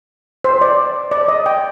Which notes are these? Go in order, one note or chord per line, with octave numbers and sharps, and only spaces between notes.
C5
D5
D5
D#5
G5